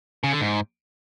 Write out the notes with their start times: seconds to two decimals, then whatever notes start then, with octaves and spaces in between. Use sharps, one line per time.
0.24 C#3
0.32 D3
0.41 G#2